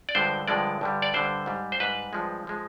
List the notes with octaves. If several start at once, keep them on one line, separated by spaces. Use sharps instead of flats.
D5
G2 D3 F3 G#3 C5
G2 D3 F3 G#3 D5
G2 D3 G3
D5
G2 D3 G3 C5
G#2 G3
C5
G#2 G3 B4
G2 F3 G#3
F3 G#3